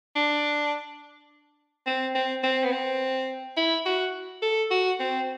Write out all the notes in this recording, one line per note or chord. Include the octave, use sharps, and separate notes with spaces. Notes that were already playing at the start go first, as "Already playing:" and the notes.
D4
C4
C4
C4
B3
C4
E4
F#4
A4
F#4
C4